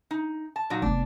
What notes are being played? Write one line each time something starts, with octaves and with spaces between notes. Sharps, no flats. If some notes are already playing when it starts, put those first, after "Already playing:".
D#4
A5
A#2 F#3 D#4
F1 B3 D4